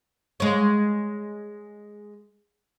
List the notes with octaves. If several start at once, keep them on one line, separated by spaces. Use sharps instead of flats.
G#3 C#5